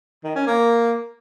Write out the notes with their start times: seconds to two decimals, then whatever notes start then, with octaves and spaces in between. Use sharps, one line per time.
0.24 D#3
0.35 C#4
0.47 A#3